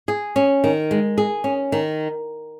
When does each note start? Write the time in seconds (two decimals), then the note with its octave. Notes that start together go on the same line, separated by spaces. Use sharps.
0.08 G#4
0.36 C#4
0.64 D#3
0.91 G#3
1.18 G#4
1.44 C#4
1.72 D#3